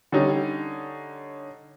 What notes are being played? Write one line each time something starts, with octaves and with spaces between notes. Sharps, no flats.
D3 G3 C#4 D#4